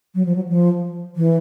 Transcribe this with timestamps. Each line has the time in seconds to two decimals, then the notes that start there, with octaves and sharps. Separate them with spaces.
0.15 F#3
0.26 F3
0.36 F#3
0.49 F3
1.16 E3